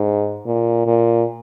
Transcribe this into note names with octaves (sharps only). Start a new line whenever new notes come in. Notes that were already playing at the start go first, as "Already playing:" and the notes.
Already playing: G#2
A#2
A#2